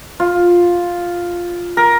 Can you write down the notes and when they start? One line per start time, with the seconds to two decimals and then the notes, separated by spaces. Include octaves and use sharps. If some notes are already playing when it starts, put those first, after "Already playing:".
0.20 F4
1.77 A#4